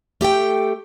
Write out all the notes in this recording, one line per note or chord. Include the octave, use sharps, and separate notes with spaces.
A3 G4 A4 G5